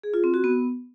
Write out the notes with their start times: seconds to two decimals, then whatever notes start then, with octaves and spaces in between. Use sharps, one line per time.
0.03 G#4
0.14 F4
0.24 C4
0.34 F#4
0.44 B3